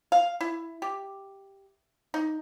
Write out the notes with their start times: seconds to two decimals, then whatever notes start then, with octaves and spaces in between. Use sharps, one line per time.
0.12 F5
0.41 E4
0.82 G4
2.14 D#4